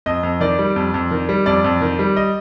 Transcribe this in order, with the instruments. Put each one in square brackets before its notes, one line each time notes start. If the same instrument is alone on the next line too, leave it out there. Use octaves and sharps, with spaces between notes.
[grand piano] F2 D#5
F2
D#3 D5
G3
F2
F2
D#3
G3
F2 D5
F2
D#3
G3
D#5